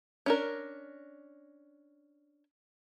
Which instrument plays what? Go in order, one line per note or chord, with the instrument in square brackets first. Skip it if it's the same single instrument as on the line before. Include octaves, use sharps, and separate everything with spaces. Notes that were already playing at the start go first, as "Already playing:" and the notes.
[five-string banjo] C#4 D4 A#4